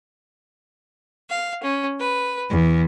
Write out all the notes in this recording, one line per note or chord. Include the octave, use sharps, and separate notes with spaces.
F5
C#4
B4
E2